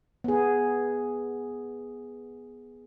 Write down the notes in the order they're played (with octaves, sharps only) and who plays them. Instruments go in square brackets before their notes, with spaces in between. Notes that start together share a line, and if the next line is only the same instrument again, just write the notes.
[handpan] B3 G#4